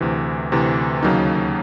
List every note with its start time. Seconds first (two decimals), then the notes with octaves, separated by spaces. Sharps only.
0.01 D2 C3 E3
0.52 D2 C3 E3
1.02 D#2 C#3 F#3 A#3 D#4